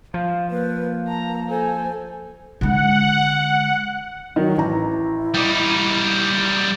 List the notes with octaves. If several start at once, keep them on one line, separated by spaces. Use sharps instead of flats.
F3 F5
A#3 B4
A5 A#5
A4 C5 G#5
D3 G#3 F#5
D#3 F#3
A1 E4 A#5
G3 D#4 D6 G6